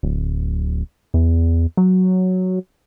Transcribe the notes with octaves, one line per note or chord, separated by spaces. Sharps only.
D1
E2
F#3